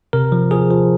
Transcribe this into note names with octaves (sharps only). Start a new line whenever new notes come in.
C3 A#4
F3
F3 G#4
F3